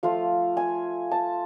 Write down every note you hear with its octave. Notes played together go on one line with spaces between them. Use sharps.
F3 A3 F4 F5
G#5
A5